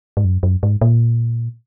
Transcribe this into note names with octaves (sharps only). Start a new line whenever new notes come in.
G#2
F#2
F#2
G#2
A#2